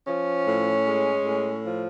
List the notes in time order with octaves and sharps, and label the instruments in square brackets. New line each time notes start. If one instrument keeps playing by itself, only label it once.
[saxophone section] F3 C#4
A2
G#3
A2
F3